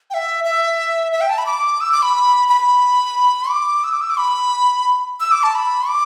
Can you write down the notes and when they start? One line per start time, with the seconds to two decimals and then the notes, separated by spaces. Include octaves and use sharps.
0.10 G5
0.14 E5
0.44 E5
1.12 E5
1.21 G5
1.30 A5
1.38 B5
1.46 D6
1.81 E6
1.92 D6
2.02 B5
2.49 B5
3.50 D6
3.84 E6
3.93 D6
4.01 E6
4.10 D6
4.18 B5
5.20 E6
5.32 D6
5.43 A5
5.55 B5
5.88 D6